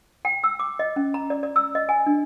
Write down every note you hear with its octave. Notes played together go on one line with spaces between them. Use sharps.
G5
E6
D6
D#5
C#4
A#5
D5
D5
E6
D#5
G#5
D4